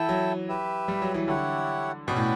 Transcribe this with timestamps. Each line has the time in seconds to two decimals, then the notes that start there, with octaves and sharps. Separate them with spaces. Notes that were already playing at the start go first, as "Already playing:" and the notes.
Already playing: E3 E4 A4 E5 G5
0.09 F#3
0.49 G4 B4 E5
0.88 G3
1.02 F#3
1.14 E3
1.28 D3 E4 G4 C#5 F#5
2.07 B2 C#4 F#4 B4 D5 G5
2.16 A2